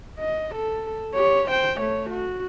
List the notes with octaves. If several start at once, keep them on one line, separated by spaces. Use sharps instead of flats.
D#5
A4
G4 C#5
C5 G5
A3 C#5
F#4